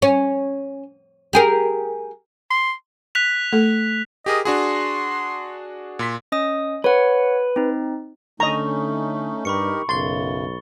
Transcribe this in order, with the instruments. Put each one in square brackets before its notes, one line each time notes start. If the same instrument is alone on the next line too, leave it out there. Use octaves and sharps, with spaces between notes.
[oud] C#4
G4 G#4 A#4
[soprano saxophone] C6
[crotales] F#6 B6 F7
[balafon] A3 A4
[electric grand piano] G4 G#4 A#4 [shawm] D#5
[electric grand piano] D4 F#4 G#4 [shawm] C6
[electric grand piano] A#2 C6 B6
[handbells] C#4 D#5 D#6
[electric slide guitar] B4 [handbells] C#5 F#5
[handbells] C4 D#4
[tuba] D3 [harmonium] A3 C#4 D#4 [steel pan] D#5 A#5 [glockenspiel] C#6
[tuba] G2 [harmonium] D#4 G4 A#4 [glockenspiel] B5 C#6 C#7
[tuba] B1 [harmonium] F#2 C#3 [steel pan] C6 [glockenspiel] A6 G7